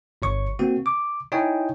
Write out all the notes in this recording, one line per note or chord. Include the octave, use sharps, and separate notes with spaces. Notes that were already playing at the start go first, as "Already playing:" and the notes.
G1 C#5 C#6
A#3 C4 F#4
D6
D#4 E4 C#5 D#5 G5 G#5